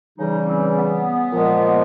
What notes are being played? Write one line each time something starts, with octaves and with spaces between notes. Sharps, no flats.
C#3 E3 G3 D#4
C4
B3
A#2 F3 G#3